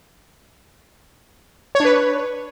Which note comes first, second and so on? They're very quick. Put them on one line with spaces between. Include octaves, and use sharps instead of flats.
C#5 D4 B4